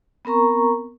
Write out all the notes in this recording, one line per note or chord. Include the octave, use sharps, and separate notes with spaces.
B3 C4 A#4 A#5 C#6